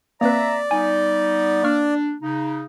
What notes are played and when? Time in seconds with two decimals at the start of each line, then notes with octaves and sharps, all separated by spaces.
0.21 A#3 C4 B4 D5 E5 A#5
0.71 G3 B3 D#4 G#5
1.63 A#3 D4 C#6 F6
2.22 C#3 D#4